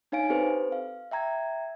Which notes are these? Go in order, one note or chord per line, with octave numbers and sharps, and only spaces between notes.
D4 D#4 C#5 F5 G#5 D7
C4 G4 A4 B4 C5
F5
E5 G5 A#5 G#6